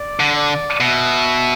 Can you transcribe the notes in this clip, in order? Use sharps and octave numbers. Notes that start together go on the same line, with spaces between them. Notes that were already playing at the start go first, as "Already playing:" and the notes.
Already playing: D5
D3
D5
B2 E5